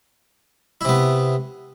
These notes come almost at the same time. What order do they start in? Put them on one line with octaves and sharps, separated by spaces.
E4 C3 B3